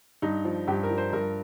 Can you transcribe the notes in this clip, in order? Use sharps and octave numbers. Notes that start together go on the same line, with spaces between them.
G2 D#4
F3
G2 G4
A#4
F3
C5
G2 A#4